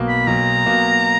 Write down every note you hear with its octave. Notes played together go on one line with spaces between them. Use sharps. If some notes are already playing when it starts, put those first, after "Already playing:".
Already playing: B1 B2 A#3
B5
B1 A#5
B2 A#3